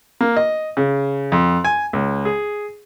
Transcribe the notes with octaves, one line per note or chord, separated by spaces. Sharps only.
A#3
D#5
C#3
F2
G#5
C#2
G#4